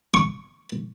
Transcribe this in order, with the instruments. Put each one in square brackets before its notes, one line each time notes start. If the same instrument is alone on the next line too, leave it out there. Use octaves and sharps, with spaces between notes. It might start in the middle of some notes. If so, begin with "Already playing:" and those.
[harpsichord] C#6